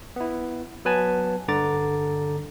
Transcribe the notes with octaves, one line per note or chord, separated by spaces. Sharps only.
B3 E4
F#3 B3 B4 G#5 A5
G2 D3 A#5 D6 A6